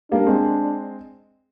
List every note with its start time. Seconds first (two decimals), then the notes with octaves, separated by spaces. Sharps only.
0.11 G3 A#3 D4
0.27 G#3 C4